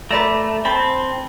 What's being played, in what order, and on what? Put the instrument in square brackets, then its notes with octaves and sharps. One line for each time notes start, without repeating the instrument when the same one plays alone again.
[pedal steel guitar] A3 [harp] B4 D5 A#5
[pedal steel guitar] C4 [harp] A5 B5